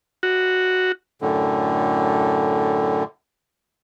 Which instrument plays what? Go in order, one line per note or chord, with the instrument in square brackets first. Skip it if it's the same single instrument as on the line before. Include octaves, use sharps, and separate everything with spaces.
[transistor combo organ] F#4
[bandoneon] F#2 A2 D3